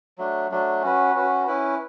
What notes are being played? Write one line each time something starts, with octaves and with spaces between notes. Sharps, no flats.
F#3 A3 D4
F#3 A3 D4
C#4 F#4 B4
C#4 F#4 B4
C#4 E4 B4